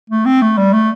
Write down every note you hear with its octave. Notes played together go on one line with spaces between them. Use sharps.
A3
C4
A3
G3
A3